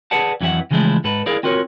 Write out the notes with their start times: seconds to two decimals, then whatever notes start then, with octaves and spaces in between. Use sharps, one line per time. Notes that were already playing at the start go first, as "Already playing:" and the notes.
0.11 G#4 A4 B4 D5 F#5 A5
0.41 F2 E3 F#3 F#4 E5 F#5
0.71 C#3 E3 F3 G#3 A3 E4
1.04 G#2 A4 B4
1.26 E4 G#4 A#4 D5 F5
1.43 C4 F4 F#4 A#4 C#5